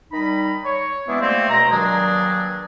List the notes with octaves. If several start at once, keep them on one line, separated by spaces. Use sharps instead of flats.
D#3 G3 D#4 B5
C#5
E3 G#3 B3 D4 E4
G3 A3 A#3 C4
C#2 B2 G#3 A#5
G2 D#3 F#3 A#3 D4 G#4